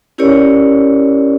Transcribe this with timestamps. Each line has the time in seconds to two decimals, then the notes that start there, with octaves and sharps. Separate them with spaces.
0.18 C#4 E4 G4 A#4 C#5 D5